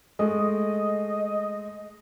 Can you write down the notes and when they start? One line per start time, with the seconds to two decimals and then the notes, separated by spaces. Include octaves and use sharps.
0.19 G#3 A3 D#5